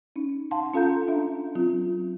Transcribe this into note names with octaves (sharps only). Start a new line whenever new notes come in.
C#4 D#4
F5 F#5 A5 C6
C#4 F4 A4 F5 A#5 G6
D4 E5
F#3 C4 F4